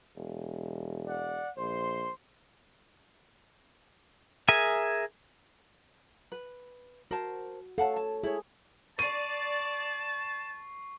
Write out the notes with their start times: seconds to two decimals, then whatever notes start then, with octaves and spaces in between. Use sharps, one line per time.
0.16 E1
1.07 D5 F#5
1.58 A#1 C5 C6
4.48 G#4 A#4 E5 G#5
6.32 B4
7.11 F#4 A#4 C5 A5
7.78 A4 C#5 F5 F#5 A5
7.96 A5
8.24 E4 G#4 C#5
8.99 D5 A5 C#6 C7 D#7